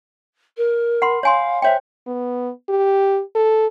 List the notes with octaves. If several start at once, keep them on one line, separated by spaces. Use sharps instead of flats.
A#4
F#5 B5 C6
C#5 F5 G#5 C6
C5 C#5 E5 G5
B3
G4
A4